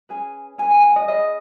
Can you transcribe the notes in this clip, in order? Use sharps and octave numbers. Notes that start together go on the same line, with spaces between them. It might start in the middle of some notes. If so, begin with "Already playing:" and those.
C#4 G#4 B4 G#5
C#4 G#4 B4 G#5
G#5
F#5
D#5
C#4 G#4 B4 D#5